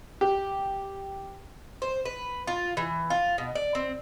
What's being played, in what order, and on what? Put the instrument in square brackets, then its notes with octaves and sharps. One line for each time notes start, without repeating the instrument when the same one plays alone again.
[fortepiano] G4
[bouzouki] C5
B4
F4
E3
F4
B2
D5
C4